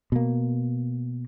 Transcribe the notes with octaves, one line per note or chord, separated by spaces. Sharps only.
B2 A#3